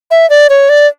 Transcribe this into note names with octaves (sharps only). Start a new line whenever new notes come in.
E5
D5
C#5
D5